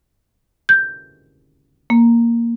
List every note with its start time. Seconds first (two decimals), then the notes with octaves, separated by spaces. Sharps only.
0.69 G6
1.90 A#3